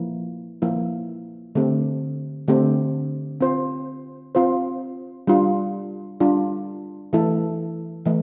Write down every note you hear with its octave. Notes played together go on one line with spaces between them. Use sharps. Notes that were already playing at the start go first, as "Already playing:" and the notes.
Already playing: F3 A#3 E4
F3 A#3 E4
D3 A3 C4 G4
D3 A3 C4 G4
C4 F4 C5
C4 F4 C5
G3 D4 F4
G3 D4 F4
E3 A3 E4 A4
E3 A3